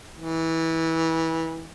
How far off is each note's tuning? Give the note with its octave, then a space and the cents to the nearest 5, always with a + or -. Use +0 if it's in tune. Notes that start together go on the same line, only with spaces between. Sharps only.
E3 -20